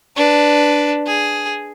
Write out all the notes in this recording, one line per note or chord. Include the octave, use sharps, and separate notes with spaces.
D4 B4
G#4